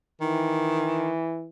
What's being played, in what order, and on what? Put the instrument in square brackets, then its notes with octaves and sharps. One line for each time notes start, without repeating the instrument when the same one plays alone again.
[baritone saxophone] D#3 [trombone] E3